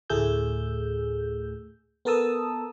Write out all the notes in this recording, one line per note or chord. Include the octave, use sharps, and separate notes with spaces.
D2 A2 A3 G#4 E6 G6
B3 A4 A#4 A5 D#6 E6